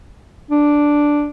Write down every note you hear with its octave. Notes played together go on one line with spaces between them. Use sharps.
D4